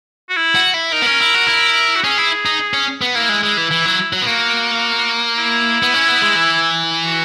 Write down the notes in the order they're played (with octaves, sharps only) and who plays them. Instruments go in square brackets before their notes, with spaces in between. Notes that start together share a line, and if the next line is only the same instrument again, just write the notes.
[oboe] F#4
E4
[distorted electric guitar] F#4
E4
[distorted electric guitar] D#4 [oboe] A#4
[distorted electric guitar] B3
C#4
E4
F#4
E4
[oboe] F#4
[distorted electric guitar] C#4 [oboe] G#4
[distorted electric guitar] E4
D#4
C#4
B3
[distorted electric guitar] A#3 [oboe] E4
[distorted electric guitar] G#3
[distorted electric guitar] G#3 [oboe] E4
[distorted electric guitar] E3
E3
F#3
F#3
B3
[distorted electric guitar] A#3 [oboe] F#4
[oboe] E4
[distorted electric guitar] B3
C#4
B3
G#3
E3
[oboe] F#4